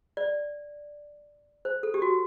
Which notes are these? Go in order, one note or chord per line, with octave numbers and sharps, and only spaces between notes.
D5
C5
A4
G4
F#4